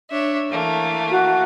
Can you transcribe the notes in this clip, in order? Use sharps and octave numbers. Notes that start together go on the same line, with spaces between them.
D4 C#5 E5
E3 A3 A#3
F#4